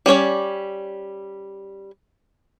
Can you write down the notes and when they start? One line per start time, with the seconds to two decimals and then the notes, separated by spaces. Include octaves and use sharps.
0.06 G3 C#4 C#5 D5